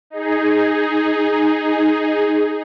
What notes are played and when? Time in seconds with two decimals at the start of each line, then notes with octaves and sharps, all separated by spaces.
0.10 D#4 G#4